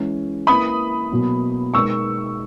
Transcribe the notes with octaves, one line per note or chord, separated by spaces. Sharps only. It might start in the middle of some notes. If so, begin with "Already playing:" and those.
Already playing: E3 G#3 C#4
A#3 E4 B4 B5 D#6
B2 F#3 A#3
B2 G#3 D#4 A#4 C#6 E6